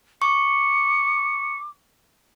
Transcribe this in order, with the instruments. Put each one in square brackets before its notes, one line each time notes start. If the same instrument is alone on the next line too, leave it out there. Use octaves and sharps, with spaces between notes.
[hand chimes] C#6 [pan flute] D6 [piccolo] C#7